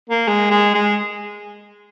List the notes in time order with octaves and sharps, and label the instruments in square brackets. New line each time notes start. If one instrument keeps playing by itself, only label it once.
[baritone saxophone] A#3
G#3
G#3
G#3